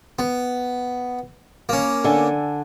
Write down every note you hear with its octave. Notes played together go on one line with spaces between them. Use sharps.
B3
A#3 C#4
D3 A4 G#5